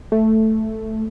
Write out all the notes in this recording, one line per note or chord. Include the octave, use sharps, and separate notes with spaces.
A3